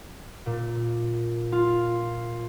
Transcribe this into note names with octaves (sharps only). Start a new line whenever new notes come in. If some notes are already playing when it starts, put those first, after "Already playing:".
A#2
F4